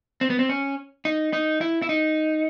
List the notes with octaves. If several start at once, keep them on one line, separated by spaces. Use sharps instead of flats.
C4
B3
C4
C#4
D#4
D#4
E4
E4
D#4